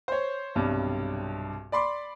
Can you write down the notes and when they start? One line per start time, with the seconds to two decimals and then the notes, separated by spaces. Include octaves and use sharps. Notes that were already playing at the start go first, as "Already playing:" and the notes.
0.08 C5 C#5
0.55 B1 G2 C3 G3
1.72 D5 B5 C6 D6